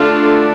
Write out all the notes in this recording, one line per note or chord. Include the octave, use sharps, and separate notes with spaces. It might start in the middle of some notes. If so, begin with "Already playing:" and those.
Already playing: D3 A3 D4 F4 A4